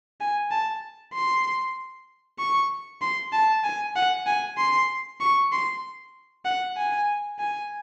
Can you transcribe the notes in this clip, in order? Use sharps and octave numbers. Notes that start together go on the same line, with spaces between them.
G#5
A5
C6
C#6
C6
A5
G#5
F#5
G#5
C6
C#6
C6
F#5
G#5
G#5